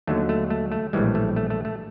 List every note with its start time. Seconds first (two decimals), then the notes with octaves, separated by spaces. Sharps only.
0.07 D#2 D3 F#3 A3
0.29 A3
0.50 A3
0.72 A3
0.93 A#1 A2 E3 G3 G#3
1.15 A3
1.36 A3
1.50 A3
1.65 A3